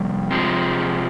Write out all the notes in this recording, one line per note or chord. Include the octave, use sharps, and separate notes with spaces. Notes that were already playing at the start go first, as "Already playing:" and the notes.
Already playing: F2 C3 G3
C3 F3 G#3